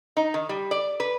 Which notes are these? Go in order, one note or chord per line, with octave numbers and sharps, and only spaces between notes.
D#4
D#3
G3
D5
B4